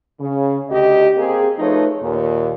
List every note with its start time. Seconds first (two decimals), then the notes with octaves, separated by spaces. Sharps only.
0.18 C#3
0.70 D2 G4 D#5
1.16 A#3 C4 G4 G#4
1.59 F3 A3 D#4 B4 C#5
2.01 D#2 A#2